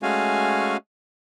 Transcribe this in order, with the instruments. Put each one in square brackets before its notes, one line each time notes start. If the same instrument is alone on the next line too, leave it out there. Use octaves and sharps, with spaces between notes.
[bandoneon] G#3 A3 C#4 F#4 F5 G#5